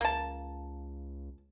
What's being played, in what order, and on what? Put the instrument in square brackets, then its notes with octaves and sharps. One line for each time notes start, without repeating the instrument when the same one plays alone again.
[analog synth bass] C#2 [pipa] A#3 A5